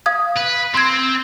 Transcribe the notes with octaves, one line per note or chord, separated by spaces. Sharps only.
F5 D#6 G#6
B4
C4 C6 G#6